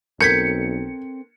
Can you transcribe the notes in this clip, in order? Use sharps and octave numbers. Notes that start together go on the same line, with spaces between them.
B1 C4 A4 A#4 G6 G#6 B6 C#7